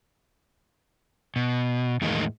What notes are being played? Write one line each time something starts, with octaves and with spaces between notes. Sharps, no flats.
B2
E2 A2 D#3 G#3 A#3 D#4